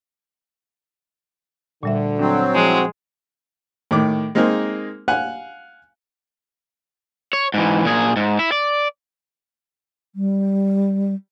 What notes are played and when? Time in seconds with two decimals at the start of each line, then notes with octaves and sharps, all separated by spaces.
1.83 D2 A#2 D3 G3 E5
2.19 F#3 C4 D4
2.55 F3 G3 G#3 E4
3.91 A2 D#3 D6
4.35 G#3 A#3 C4 D#4 G#4 A#4
5.08 F5 F#5 G#5 F#6
7.33 C#5
7.54 G#2 E3
7.85 A#2 G#4
8.16 G#2
8.39 E4
8.52 D5
10.15 G3